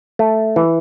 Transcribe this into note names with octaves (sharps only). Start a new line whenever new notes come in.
A3
E3